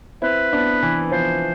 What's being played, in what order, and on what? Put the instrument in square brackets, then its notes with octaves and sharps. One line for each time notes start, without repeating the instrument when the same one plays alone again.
[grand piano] C4 E4 [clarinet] B4
[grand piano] B3 D4
E3
[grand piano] F3 [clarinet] C5